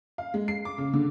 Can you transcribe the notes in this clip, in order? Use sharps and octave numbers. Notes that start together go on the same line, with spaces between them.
F5
G#3
C7
D6
C#3
D3